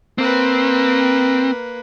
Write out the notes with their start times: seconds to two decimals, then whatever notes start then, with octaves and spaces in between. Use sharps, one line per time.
0.18 A#3 C4 B4